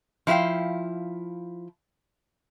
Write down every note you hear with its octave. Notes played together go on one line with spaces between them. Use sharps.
F3 E4 G#4 F5 G5